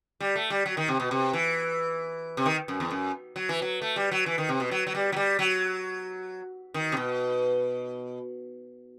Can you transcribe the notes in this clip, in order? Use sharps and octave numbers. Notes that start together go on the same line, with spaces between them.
G3
A3
G3
F#3
D#3
C3
B2
C3
E3
C3
D#3
F#2
E2
F#2
F#3
E3
F#3
A3
G3
F#3
E3
D#3
C3
B2
F#3
F#3
G3
F#3
G3
F#3
D#3
C3
B2